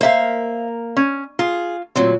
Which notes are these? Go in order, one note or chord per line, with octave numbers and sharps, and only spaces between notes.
A#3 A#4 C5 E5 F5
C#4
F4 G#4
D2 A#2 F#3 C4